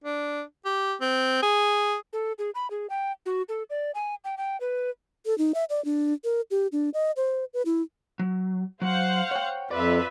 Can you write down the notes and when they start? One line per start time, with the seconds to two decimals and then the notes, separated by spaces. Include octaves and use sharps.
0.04 D4
0.65 G4
1.01 C4
1.43 G#4
2.13 A4
2.39 G#4
2.55 B5
2.71 G#4
2.90 G5
3.26 F#4
3.49 A4
3.70 D5
3.95 G#5
4.24 G5
4.37 G5
4.60 B4
5.26 A4
5.38 D#4
5.54 E5
5.70 D5
5.85 D4
6.24 A#4
6.51 G4
6.72 D4
6.94 D#5
7.16 C5
7.54 B4
7.66 E4
8.19 F#3
8.82 F#3 C5 F5 F#5
9.31 C#5 G5
9.71 F2 F4 B4 D5 E5